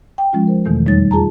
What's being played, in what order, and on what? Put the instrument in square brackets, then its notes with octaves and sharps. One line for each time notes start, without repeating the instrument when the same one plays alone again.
[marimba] G5
F3 G#3 C#4 F4
A#4 C5
E2 B2 D#3 E3 A3 A4
F2 G3 D#4 C#5 A6
F4 G#4 A5 A#5